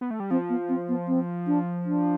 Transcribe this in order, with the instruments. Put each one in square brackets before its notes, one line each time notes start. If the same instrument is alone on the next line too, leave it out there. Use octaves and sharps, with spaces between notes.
[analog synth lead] B3
A3
G3
[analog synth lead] F3 [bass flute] C4
[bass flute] B3
C4
B3
C4
D4
D4